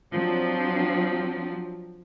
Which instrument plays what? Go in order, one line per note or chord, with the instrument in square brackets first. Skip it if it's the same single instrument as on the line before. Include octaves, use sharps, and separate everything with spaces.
[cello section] F3 F#3 C4 D4